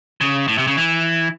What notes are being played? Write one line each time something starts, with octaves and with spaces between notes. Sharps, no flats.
C#3
A2
C3
C#3
E3